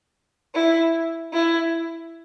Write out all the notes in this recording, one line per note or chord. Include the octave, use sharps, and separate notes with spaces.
E4
E4